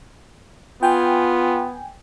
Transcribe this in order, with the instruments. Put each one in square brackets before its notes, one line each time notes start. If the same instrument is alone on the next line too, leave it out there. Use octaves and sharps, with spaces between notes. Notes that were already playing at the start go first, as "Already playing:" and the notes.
[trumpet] B3 [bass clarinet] F4 [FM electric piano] G5 G#5